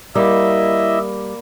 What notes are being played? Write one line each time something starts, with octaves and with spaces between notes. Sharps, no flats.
G3 A#3 E4 D#5 E5 B5 D6